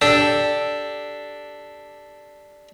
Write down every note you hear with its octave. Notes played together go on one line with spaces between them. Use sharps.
D4 G4 A4